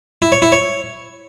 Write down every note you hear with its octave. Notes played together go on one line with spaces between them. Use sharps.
E4
C#5
E4
C#5